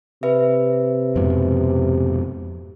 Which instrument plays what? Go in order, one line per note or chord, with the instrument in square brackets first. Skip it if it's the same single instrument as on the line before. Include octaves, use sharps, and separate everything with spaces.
[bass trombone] C3 [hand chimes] B4 E5
[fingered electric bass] F2 G#2 B2